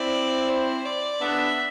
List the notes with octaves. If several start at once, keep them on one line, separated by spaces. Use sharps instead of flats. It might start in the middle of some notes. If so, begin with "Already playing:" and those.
Already playing: C4 E4 D5
C5
D5
B3 D4 E5